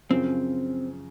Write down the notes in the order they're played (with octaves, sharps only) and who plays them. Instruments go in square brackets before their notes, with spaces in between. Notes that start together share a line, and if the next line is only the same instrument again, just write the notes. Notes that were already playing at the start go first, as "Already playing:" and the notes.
[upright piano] F#2 C#3 F3 [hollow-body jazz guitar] C4